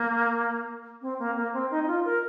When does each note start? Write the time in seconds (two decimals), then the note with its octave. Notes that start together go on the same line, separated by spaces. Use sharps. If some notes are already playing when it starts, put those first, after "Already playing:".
Already playing: A#3
1.02 C4
1.19 A#3
1.36 A#3
1.54 C4
1.71 D#4
1.83 D#4
1.87 F4
2.05 A#4